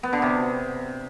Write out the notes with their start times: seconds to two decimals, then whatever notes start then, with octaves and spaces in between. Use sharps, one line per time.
0.03 B3
0.13 D3
0.22 C3